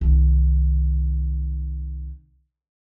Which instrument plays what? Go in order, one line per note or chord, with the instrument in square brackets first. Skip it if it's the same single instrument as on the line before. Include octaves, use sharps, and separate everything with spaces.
[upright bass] C2 D#3